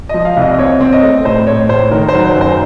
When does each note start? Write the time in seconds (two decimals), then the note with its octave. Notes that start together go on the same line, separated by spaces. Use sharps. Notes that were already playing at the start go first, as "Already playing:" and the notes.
0.09 F3 D#5
0.25 F5
0.37 C2 D#5
0.58 C4 C#5
0.81 C4
0.93 D#5
1.03 A3
1.25 A2 C5
1.47 A2 C#5
1.69 A2 C5
1.91 D#3 A#4
2.08 F#3 C5
2.25 C5
2.36 F#2 C5